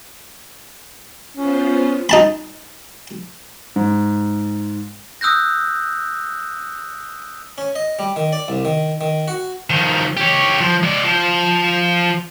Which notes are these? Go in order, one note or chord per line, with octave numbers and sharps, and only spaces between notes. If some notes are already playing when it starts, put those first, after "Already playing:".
B3 C#4 F4 C5
D#4 A5 B5
G#2
D#6 E6 F#6 G6 A#6
C#4
D#5
G3
D#3
D5
C2
D#3
D#3
F#4
D#3 F3
G4 C#5
F3
G#3 D5
F3